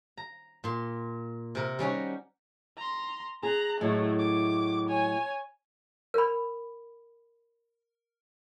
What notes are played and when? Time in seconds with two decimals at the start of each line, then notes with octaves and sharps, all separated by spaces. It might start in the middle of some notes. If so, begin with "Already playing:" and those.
0.17 A#5
0.64 A#2 C6
1.55 C3 A#4
1.79 G3 C#4 D#4 F#4
2.78 A#5 C6
3.43 G#4 A#5 F#6
3.81 A2 F#3 G#3 A3
4.19 D6
4.89 C#5 G#5
6.14 A#4 B5